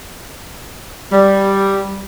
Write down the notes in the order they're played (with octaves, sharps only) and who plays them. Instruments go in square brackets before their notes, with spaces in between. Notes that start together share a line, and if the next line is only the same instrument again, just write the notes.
[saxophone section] G3